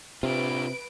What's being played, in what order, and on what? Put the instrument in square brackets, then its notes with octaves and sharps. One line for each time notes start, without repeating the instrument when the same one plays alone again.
[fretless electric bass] C3 [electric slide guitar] D4 F4 [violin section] B4 D7